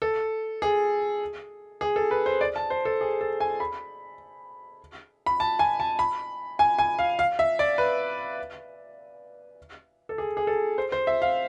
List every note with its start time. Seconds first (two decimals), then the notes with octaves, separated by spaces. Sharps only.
0.02 A4
0.62 G#4
1.81 G#4
1.96 A4
2.11 B4
2.26 C5
2.41 D5
2.56 A5
2.70 C5
2.85 A4
3.01 G#4
3.21 A4
3.40 G#5
3.60 B5
5.26 B5
5.40 A5
5.59 G#5
5.80 A5
5.99 B5
6.59 G#5
6.79 G#5
6.99 F5
7.19 F5
7.39 E5
7.59 D5
7.78 B4
10.09 A4
10.18 G#4
10.37 G#4
10.47 A4
10.78 C5
10.92 C5
11.07 E5
11.22 F5